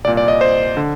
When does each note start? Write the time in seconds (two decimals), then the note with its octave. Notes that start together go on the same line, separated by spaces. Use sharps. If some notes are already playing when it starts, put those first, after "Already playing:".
0.04 C2 D5
0.07 A#2
0.17 D5
0.28 D#5
0.41 C5
0.77 D3